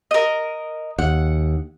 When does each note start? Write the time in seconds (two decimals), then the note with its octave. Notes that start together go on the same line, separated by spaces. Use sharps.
0.11 A#4 D#5
0.99 D#2 F#5